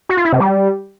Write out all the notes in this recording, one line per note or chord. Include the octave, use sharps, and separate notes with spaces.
F#4
F4
E4
C3
G3